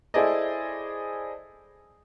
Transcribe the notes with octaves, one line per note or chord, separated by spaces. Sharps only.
E4 G#4 A4 C5 D5 D#5